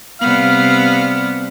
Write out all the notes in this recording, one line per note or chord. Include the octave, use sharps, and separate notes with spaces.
C3 G3 B3 F5